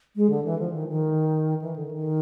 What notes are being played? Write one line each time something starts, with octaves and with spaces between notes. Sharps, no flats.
G#3
D3
E3
F3
D#3
D#3
E3
D3
D#3